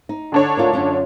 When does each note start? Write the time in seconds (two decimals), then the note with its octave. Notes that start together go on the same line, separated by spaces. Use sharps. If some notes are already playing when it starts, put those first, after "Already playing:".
0.09 D#4
0.32 D3 D4 C#5
0.57 D2 F4 A#4
0.73 F#2 C#4 F4